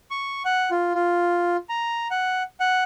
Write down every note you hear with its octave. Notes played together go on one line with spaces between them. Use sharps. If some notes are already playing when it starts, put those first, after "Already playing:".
C#6
F#5
F4
F4
A#5
F#5
F#5